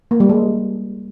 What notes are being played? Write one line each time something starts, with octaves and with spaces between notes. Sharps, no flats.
A#3
G3
G#3